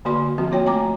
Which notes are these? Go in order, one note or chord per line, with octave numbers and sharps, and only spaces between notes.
D3 A#3 F#4 D5 C6
F3 C4 F#4
A#3 F4 C#5 G5
A3 G#5 A#5 D6